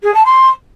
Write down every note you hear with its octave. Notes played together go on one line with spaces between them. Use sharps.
G#4
A5
C6